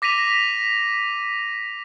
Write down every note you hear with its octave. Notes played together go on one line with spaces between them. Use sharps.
D6 A#6 B6 D#7 F7